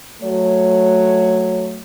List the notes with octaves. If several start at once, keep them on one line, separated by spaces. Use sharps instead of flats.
F#3 A3 C#5